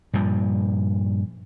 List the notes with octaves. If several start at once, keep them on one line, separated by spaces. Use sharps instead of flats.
G2 A#2 F3